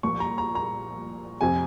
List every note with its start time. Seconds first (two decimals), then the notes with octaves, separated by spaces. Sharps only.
0.03 C2 A#2 F3 A#3 C#6
0.20 A#5
0.38 A#5
0.55 A#5
1.41 F2 C3 F3 C4 F4 G#5